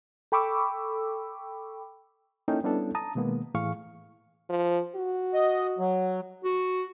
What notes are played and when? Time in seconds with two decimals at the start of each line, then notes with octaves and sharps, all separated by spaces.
0.32 A4 G5 B5 C#6 D6 E6
2.48 A#3 C#4 D#4 E4 A4 G5
2.64 G3 B3 C#4 D4 E4 A4
2.95 A5 A#5 D#6
3.15 B2 D#3 G#3 A#3 B3
3.54 A2 E3 G#4 F5 C#6
4.49 F3
4.95 F#4
5.34 D#5
5.79 F#3
6.44 F#4